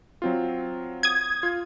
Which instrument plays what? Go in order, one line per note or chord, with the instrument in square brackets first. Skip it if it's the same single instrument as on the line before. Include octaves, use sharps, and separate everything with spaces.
[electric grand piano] F#3 C4 F4
[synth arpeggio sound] D#6 G#6
[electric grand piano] F4